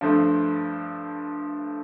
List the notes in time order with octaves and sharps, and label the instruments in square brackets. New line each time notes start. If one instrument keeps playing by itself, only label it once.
[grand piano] G2 F3 A3